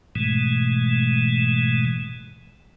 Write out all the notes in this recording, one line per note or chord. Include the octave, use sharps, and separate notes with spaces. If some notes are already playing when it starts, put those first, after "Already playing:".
G#2 B2 E3 G#3 A3